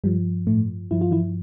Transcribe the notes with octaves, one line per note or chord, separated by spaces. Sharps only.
G2 F3 G3
A2 A3
G2 F3 E4
F4
E3 E4